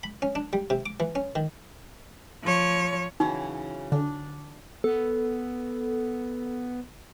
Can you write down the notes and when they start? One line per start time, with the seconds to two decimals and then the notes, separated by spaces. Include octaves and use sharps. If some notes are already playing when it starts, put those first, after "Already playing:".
0.03 B5
0.22 C#4
0.35 D4
0.53 G3
0.70 C3
0.86 D6
1.00 E3
1.15 C#4
1.35 D#3
2.44 F3 C#5
3.20 C#3 E3 F#3 D#4
3.92 D3 D4
4.84 B3 A4